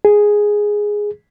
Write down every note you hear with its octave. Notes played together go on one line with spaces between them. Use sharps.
G#4